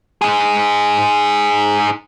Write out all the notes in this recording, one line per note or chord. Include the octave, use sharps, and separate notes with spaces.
D#4 G#4